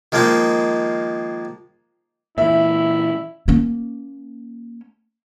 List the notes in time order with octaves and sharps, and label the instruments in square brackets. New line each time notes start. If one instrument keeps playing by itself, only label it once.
[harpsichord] D#3 F3 G#3 A#3 C4 D#4
[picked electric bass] A#2 E3 [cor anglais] E4 [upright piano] E5
[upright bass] A#3 C#4